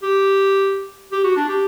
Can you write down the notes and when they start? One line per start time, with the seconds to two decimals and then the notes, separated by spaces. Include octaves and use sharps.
0.03 G4
1.12 G4
1.24 F#4
1.37 D4
1.48 G4